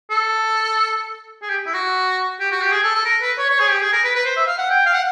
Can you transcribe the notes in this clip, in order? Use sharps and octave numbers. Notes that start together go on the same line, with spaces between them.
A4
G#4
G4
E4
F#4
G4
F#4
G4
G#4
A4
A4
A#4
B4
C#5
C#5
G#4
G4
G#4
A#4
B4
B4
C5
E5
F5
F#5
G5
F5
F#5